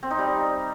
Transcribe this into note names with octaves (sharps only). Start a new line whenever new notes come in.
C4
D#4
G3